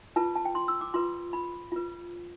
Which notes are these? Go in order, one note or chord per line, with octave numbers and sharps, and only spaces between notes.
F4 B4 A5
A5
G5
C6
E6
D6
F4 B4 C6
B5
F4 B4